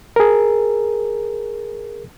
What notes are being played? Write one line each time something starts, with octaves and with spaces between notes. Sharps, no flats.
G#4 A#4